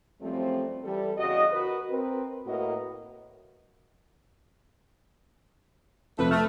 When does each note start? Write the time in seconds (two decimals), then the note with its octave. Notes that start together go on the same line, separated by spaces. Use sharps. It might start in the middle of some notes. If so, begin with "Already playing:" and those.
0.21 F#2 F3 G3 A3 C4
0.84 E3 G3 A4
1.18 E2 C#3 F#4 D#5
1.52 F#4 A#4 B4
1.90 C4 A#4 B4
2.46 A2 A#3 F#4 A#4 B4 D#5
6.19 F1 F2 A3 A4 B4
6.31 A3 F6 A6